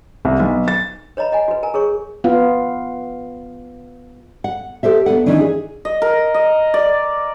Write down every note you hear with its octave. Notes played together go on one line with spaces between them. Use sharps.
C2
B1
A6
B4 C#5 D#5 A#5 B5
D#5 F#5 G#5
F#4 B4
A#4 G#5 A#5
G#4 A#4 B4 C#5 C#6
B3 F4 F5
F#5
G4 A4 C5 E5
B3 D4 B4 F#5
D#3 E3 C#4 D4
G#4
D#5
A#4
D#5
D5